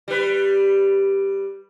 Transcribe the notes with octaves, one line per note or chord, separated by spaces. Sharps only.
G3 B4